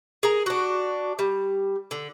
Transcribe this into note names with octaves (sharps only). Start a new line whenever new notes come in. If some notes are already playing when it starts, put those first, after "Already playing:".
G#4 A#4 A#5
D4 F#4
G3
D3